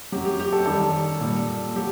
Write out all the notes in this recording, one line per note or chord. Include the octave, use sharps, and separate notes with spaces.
F#2 F#3 G4
G4
G4
A4
F#2 D#3 G3 A4
A#2 G3
F#3 G4